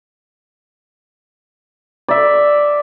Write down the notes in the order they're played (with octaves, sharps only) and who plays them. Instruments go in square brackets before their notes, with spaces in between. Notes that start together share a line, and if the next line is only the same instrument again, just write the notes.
[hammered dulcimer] D5 E5